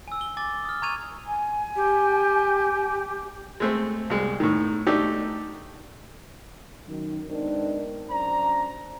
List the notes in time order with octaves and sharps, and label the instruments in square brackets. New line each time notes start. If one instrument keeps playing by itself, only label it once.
[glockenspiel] G#5 E6
G7
G#5 D6 A6
D#6 F6
A#5 C#6 G#6 D#7 F7
[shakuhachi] G#5
[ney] G4
[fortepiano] G#3 A3 C4
C2 G#3
A2 D#3
A3 D4 D#4 G4
[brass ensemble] F#2 D#3
G#3 B3 C4 D4 D#4 A#4
F#2 D4 C5 A#5